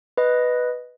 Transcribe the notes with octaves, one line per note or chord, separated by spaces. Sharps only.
B4 D#5